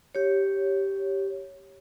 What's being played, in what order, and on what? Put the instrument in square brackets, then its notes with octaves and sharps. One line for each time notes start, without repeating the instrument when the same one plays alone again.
[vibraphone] G4 C#5